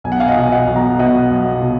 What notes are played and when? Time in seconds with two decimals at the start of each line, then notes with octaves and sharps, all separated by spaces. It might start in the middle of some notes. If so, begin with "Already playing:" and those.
0.04 B1 G#5
0.12 F#5
0.20 F5 G#5
0.28 D#5 F#5
0.36 B2
0.51 D#5 F#5
0.67 B1
0.75 F#5 A#5
0.99 B2 D#5 F#5
1.31 B1
1.62 B2